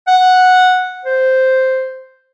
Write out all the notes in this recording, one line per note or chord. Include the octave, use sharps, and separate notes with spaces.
F#5
C5